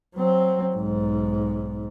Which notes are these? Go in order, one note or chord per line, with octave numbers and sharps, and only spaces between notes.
F#3 C4
B1 G#2